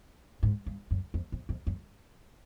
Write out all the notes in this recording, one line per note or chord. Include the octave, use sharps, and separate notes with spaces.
G#2
G2
F#2
F2
F2
F2
F#2